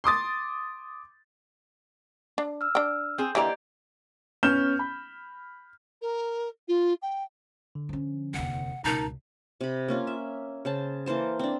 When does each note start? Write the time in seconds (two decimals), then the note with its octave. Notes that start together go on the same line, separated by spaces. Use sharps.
0.04 C6 D6 D#6 A6
2.38 D4
2.61 E6 F6
2.75 D4 G5
3.18 C4 G#4 G6
3.35 D3 E3 A#3 G4 D5 D#5
4.43 B3 C#4 F6 G6 E7
4.79 B5
6.01 A#4
6.68 F4
7.02 G5
7.75 D3
7.89 F3 C#4
8.34 F1 D#2 F#5
8.84 C#2 B2 D#4 A#4 A5 A#5
9.61 C3 B5
9.88 A#3 C#4 F4
10.07 E5
10.65 C#3 C5 A5
11.06 E3 A#3 C5 A5
11.39 C4 D4